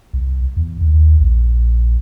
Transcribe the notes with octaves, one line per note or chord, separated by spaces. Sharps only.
C2
E2
D#2
A#1